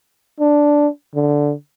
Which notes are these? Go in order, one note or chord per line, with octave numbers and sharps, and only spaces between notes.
D4
D3